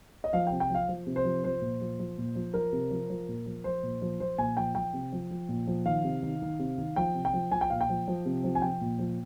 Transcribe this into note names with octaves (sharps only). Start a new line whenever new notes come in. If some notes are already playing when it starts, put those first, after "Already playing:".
D#5
F3 F5
G5
C3
G5
F3 F5
F3
C3
C5
F3
F3 C5
A#2
F3
F3
A#2
F3
F3 A#4
C3
F3
F3
A#2
F3
F3 C5
A#2
F3
F3 C5
A#2 G#5
F3 G5
F3 G5
C3
F3
F3
A#2
F3
D#3 F5
C3
D#3
D#3
C3
D#3
F3 G5
C3
G5
F3
F3 G#5
G5
A#2 F5
G5
F3
F3
C3
F3
G#5
F3 G5
A#2
F3